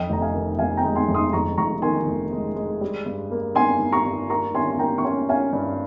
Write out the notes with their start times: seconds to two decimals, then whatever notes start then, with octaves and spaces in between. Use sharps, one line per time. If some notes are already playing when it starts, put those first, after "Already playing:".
Already playing: F2 D#5 G5
0.10 F1 A#5
0.21 F5 G#5
0.34 D#3
0.58 F1 F5 G#5
0.77 G5 A#5
0.84 G#3
0.96 G#5 C6
1.08 F2
1.14 C6 D#6
1.33 F2 A#5 C#6
1.57 F1 A#5 C#6
1.82 D#3 G#5 C6
2.07 F1
2.33 G#3
2.56 G#3
2.81 G3
3.06 G2
3.32 A#3
3.55 G2 G#5 C6
3.80 G2
3.92 A#5 C#6
4.06 G2
4.30 A#3 A#5 C#6
4.54 C#4 G#5 C6
4.70 C6
4.79 A#3 G5 A#5
4.98 C#6
5.04 C#4 G#5 C6
5.29 C#4 F5 G#5
5.53 G2